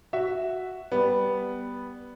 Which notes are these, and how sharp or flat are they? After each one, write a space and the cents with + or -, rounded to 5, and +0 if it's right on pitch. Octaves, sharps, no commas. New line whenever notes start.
F#4 +0 E5 +0
G3 +5 B3 +0